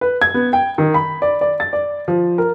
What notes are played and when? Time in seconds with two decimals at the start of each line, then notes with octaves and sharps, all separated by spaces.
0.01 B4
0.22 G#6
0.34 B3
0.53 G5
0.78 D#3
0.94 B5
1.22 D5
1.41 D5
1.60 A6
1.73 D5
2.08 F3
2.38 A#4